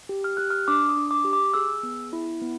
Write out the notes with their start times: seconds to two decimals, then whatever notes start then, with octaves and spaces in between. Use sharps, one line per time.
0.09 G4
0.24 F6
0.37 G4 F#6
0.50 F6
0.68 D4 D6
0.89 D#6
0.97 D4
1.11 D6
1.25 G4
1.33 D6
1.54 G#4 E6
1.83 B3
2.13 E4
2.41 B3